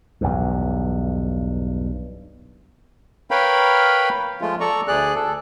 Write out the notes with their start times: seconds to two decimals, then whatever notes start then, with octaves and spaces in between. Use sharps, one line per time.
0.21 B1 E2 G2
3.31 A#4 B4 C#5 F5 G5 B5
4.41 F3 G#3 A3 F4
4.60 A4 D5 A#5 C#6
4.88 D2 G#4 D5 F#6
5.15 A4